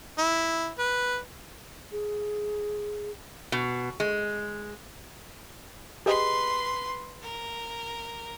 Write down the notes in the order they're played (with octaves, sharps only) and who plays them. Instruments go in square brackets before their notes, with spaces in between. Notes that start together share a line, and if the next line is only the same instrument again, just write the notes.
[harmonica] E4
B4
[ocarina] G#4
[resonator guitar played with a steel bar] B2
G#3
[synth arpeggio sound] G4 G#4 D#5 [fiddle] B4 C6
[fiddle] A#4